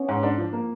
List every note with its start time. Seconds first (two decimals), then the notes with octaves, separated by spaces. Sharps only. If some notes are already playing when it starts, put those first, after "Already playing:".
Already playing: B3 C#4
0.09 G#2
0.23 D4
0.38 F3
0.53 A#3